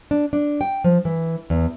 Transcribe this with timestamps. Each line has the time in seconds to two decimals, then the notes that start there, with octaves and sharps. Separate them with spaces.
0.11 D4
0.33 D4
0.61 G5
0.84 F3
1.05 E3
1.50 E2